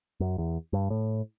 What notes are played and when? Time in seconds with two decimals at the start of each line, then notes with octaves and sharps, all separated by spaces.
0.20 F#2
0.38 E2
0.73 G2
0.90 A2